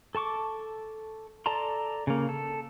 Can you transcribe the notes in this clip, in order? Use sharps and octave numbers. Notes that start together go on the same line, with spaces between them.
A4 A5 C#6 D6
A4 D5 A5 A#5 C6
C#3 A#3
A4